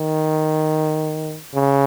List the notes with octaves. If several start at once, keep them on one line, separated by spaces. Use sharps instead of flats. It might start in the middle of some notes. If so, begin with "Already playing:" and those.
Already playing: D#3
C#3